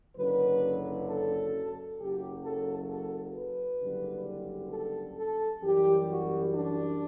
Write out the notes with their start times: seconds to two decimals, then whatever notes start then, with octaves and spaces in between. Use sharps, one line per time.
0.16 F#1 F#2 D3 F#3 B4
1.08 A4
1.99 F#1 F#2 F#3 G4
2.44 A4
2.89 A4
3.35 B4
3.81 F#1 F#2 D3 G3
4.71 A4
5.18 A4
5.62 F#2 E3 G3 G4
6.09 F#4
6.54 D4